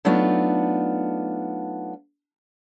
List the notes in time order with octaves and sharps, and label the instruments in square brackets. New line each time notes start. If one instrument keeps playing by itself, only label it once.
[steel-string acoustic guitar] F#3 A3 B3 D4 D#4 F4